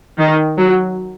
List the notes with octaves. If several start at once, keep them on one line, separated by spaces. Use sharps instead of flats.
D#3
F#3